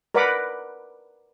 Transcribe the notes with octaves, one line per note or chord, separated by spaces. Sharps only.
A#4 B4 D5 F#5 B5 D6